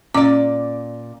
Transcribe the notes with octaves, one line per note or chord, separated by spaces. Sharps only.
A#2 C#4 D5 D6